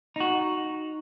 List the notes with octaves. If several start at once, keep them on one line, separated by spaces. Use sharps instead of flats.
D#4 F#4